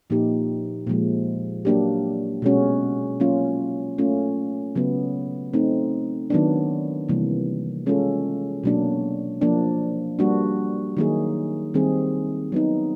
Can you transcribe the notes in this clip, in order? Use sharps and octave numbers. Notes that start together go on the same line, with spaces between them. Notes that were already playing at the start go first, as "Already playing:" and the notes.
A#2 F3 A#3 D#4 G4
A#2 F3 G#3
F#3 A#3 D4 G4
B2 G#3 C#4 F#4
F#3 A#3 C#4 F4
A3 C#4 F4
C#3 F#3 B3
A3 C4 D#4
D#3 F#3 B3 D4
C3 E3 G3 A#3
G#3 C#4 F4 A4
B2 F#3 A#3 D4
F3 A#3 D4
G3 A#3 D4 F#4
D#3 F#3 A#3 D#4 G#4
D#3 G3 C4 D#4 G#4
F#3 B3 D#4